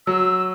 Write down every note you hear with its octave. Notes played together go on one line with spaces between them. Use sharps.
F#3 E6